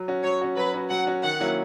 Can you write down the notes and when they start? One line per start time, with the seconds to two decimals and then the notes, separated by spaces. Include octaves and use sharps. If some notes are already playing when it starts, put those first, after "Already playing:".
Already playing: F#3
0.08 C#4 F#4
0.24 F#3 C#5
0.41 C#4 F#4
0.57 F#3 B4
0.74 C#4 F#4
0.90 F#3 F#5
1.07 C#4 F#4
1.23 D#3 F#5
1.40 F#3 A#3 C#4 E4